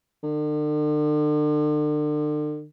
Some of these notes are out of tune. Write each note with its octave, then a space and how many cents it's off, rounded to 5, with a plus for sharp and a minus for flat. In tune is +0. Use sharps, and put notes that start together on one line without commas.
D3 +40